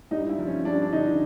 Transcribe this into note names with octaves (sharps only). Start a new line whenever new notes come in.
G2 D#4
E4
F3
C#4
G2 D4
D4
D3 D#4